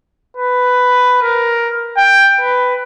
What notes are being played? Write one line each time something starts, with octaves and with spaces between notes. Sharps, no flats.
B4
A#4
G5
B4